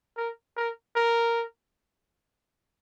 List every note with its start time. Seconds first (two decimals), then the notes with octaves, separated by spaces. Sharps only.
0.17 A#4
0.57 A#4
0.96 A#4